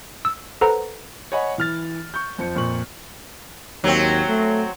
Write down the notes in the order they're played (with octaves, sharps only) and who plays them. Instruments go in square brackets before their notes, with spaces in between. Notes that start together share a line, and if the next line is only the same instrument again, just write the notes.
[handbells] E6
A4 B4 C5 F#5 A#5
[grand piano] C#5 D#5 F#5 G#5 B5
E3 F6 A6
C#6 G6
F2 F3 C#7
F2 A#2 C#6 F#7
[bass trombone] D#2 [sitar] F#3 C4
[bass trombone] A3